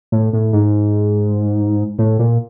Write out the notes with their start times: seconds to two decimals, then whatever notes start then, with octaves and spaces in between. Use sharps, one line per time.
0.12 A2
0.33 A2
0.53 G#2
1.99 A2
2.19 A#2